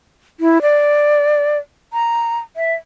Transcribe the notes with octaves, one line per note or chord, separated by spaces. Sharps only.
E4
D5
A#5
E5